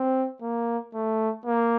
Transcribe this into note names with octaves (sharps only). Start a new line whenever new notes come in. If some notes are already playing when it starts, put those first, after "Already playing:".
Already playing: C4
A#3
A3
A#3